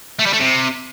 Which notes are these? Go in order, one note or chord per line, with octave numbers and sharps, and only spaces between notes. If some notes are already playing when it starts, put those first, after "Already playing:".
A3
G3
A3
C3